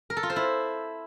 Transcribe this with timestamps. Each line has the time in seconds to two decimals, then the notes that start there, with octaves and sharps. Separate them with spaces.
0.10 A#4
0.17 A4
0.23 F4
0.30 C5
0.36 E4